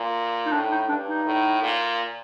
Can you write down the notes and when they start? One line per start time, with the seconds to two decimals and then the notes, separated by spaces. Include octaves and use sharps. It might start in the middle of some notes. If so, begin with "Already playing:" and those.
Already playing: A#2
0.46 D#4
0.52 A2 D4
0.71 D#4
0.89 G2 D4
1.07 D#4
1.25 A2
1.63 A#2